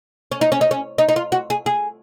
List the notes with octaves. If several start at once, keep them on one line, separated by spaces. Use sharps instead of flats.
C#4
D#4
C#4
D#4
C#4
D#4
D#4
F4
F#4
G#4
G#4